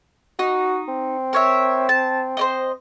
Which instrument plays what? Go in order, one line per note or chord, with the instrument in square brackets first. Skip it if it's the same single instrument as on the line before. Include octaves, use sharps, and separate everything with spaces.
[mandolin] D#4 [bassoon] F#4
[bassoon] C4
[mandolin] A#4 C#5 E5
A5
C5 D5 D#5